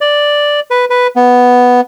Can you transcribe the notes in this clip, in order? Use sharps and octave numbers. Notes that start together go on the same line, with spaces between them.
D5
B4
B4
B3